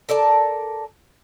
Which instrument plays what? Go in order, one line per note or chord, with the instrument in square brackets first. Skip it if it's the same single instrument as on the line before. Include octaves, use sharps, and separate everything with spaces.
[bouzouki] A4 A#4 D5 A5